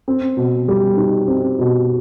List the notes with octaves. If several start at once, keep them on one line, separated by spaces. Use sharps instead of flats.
C4
B2
G3
D#4
C4
B2